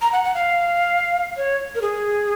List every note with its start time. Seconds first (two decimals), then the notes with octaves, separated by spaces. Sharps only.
0.02 A#5
0.12 F#5
0.24 F#5
0.35 F5
1.37 C#5
1.75 A#4
1.81 G#4